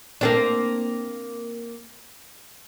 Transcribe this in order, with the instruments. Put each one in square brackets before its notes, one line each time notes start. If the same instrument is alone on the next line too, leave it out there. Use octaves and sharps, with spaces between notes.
[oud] A#3 C4 D4